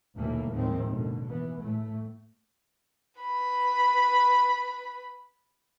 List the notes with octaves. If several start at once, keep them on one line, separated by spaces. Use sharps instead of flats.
G1 D#2 B2 E3 A3 A#3
D#2 A2 D#3 F3 G#3 C4
F#1 B2 D3
E3 B3
A2 A3
B4 B5